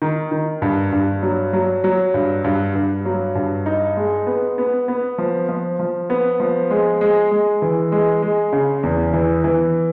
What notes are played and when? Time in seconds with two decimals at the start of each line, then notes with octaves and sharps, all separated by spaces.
0.02 D#3
0.32 D#3
0.62 G2
0.92 G2
1.23 F#3
1.53 F#3
1.84 F#3
2.14 G2
2.44 G2
2.75 G2
3.05 F#3
3.35 G2
3.66 D#4
3.97 G#3
4.27 B3
4.58 B3
4.88 B3
5.18 F3
5.49 F3
5.79 F3
6.10 B3
6.40 F3
6.70 G#3
7.01 G#3
7.31 G#3
7.62 E3
7.92 G#3
8.22 G#3
8.53 C#3
8.83 E2
9.13 E3
9.44 E3